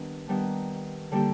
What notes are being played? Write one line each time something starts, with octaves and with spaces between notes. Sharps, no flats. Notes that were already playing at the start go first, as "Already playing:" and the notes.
Already playing: D#3 G3 B3 D4
D#3 G3 B3 D4
D3 G3 A#3 D4 G4